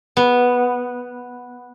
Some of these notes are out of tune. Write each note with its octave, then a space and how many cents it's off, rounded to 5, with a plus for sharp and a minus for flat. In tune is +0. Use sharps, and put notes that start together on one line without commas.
B3 -5